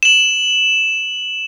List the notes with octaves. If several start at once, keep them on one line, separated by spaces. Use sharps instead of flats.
E7 F#7